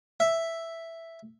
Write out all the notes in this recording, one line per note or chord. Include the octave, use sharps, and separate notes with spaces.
E5